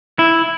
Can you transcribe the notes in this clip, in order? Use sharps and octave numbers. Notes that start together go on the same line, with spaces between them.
E4